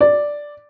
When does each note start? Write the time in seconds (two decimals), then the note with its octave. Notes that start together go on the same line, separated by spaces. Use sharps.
0.01 D5